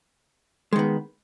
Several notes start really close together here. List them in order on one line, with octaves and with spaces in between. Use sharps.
G#3 D#3 B3